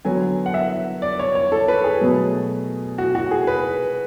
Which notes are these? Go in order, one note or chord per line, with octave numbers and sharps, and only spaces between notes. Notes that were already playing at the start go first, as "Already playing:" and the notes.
D3 F#3 B3 G#5
F#5
E5
D5
C#5
C#5
A4
B4
G#4
B2 F#3 A3
F#4
F#4
G#4
B4